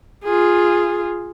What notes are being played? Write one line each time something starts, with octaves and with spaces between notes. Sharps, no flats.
F4 G#4